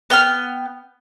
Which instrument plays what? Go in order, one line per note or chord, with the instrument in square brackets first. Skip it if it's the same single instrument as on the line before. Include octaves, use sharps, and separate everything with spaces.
[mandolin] B3 G5 G#5 F6